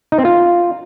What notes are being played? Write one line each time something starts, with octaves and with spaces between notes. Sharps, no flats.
D#4
C4
F4